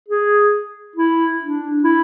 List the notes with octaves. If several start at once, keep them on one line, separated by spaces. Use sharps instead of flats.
G#4
E4
D4
E4